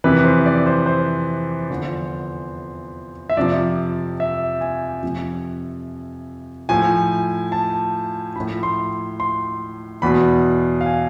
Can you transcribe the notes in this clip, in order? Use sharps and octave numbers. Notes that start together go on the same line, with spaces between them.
F2 C3 E3 B4
C5
D5
C5
C5
E2 D3 F3
E5
F2 C3 F3 D5
E5
G#5
F2 C3 F3
A2 F3 G#5
A5
A2 F3 B5
C6
C6
E2 B2 B5
F5
G#5